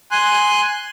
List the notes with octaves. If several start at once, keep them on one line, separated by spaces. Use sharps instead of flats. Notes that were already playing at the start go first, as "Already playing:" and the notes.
G#5 C6 F#6